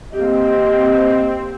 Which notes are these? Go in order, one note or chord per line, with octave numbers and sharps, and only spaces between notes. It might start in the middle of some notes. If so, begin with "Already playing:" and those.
A#3 C4 G4 D#5